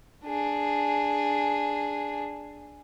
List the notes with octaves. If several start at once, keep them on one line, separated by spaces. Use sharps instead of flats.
D4 G#4